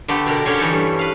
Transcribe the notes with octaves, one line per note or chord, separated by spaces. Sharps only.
D3 A3 B3 G4
B2 D4 A#4
D3 C#4 D4 G4 C#5 C6
E3 D#4 A4
G2
B4 F5